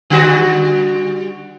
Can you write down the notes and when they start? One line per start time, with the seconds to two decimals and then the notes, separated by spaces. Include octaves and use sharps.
0.10 D3 G3 F#4